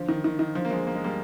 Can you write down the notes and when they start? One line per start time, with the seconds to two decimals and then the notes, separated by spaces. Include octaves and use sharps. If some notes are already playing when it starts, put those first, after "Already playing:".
Already playing: D3 F3
0.09 D#3
0.24 D#3
0.39 D#3
0.55 D3 F3
0.65 A#3
0.70 F3 G#3
0.87 A#3
0.96 G#3
1.04 G3 A#3